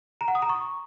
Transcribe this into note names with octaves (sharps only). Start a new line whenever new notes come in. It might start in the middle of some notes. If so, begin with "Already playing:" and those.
A#5
F#5
D#6
A#5
C#6